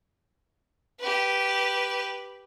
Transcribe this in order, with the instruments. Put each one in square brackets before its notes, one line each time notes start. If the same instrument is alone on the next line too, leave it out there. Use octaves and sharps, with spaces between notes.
[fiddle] G4 B4